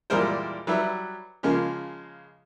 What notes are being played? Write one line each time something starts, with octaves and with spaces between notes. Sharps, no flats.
E2 A#2 G3 G#3 A#4 C5
F#3 G3 B4 E5
C#3 F3 G#3 A#3